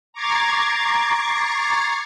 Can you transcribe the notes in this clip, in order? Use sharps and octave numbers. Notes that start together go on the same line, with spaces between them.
A#5 C#6 D6 G#6 A6 C7